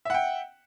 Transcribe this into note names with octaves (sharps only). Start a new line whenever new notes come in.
E5 F#5 G5